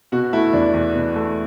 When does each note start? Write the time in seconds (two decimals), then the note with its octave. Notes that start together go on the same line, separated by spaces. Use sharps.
0.12 B2 F#4
0.33 A3 E4
0.53 E2 D4
0.74 E2
0.94 B2
1.16 A3